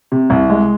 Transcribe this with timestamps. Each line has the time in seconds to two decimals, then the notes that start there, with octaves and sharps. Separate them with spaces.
0.12 C3
0.30 C2
0.50 G#3